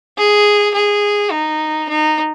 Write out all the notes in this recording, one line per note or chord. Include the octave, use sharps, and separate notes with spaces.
G#4
G#4
D#4
D#4